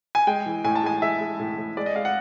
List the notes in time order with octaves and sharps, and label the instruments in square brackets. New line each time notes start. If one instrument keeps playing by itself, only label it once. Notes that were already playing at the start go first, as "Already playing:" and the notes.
[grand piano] G#5
G#3 G5
E3
A2 G#5
A5
G#3 G#5
G#3 E5
G#3
A2
A2
G#3 D5
D#5
G#3 F5
F#5